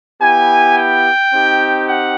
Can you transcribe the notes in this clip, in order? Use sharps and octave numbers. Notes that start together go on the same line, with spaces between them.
B3 E4 G4 G#5
G5
C4 D#4 G4
F#5